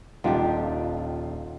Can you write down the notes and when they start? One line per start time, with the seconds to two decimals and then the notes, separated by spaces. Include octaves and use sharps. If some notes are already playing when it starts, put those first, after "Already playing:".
0.24 D#1 D#3 D4 F4 G4